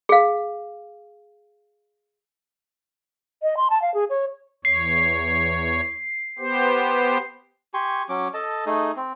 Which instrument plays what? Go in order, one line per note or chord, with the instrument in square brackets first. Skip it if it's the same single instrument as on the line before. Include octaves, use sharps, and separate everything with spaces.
[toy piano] G#4 F5
[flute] D#5
C6
A5
F5
G#4
C#5
[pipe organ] E2 C#5 [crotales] C7
[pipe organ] B3 G4 C5
[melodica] G4 G#5 C6 C#6
F#3 C#4 D6
A4 D#5 A5
A3 D#4 G#4
C4